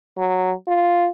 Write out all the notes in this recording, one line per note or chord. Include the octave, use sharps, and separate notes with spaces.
F#3
F4